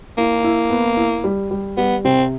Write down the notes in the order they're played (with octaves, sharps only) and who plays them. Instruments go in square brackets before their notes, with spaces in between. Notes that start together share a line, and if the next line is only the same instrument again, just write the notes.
[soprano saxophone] A#3 [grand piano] E4
[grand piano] E4
B3
E4
G3
G3
[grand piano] G3 [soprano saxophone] B3
[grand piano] C3 [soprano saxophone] C4